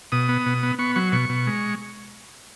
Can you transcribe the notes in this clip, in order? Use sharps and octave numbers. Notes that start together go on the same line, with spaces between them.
B2 D#6
B3
B2
B3
B3 C#6
F#3 C#6
B2 C#6
B2
G#3